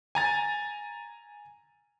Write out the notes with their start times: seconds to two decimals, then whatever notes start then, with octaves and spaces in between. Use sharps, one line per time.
0.15 G#5 A#5 A6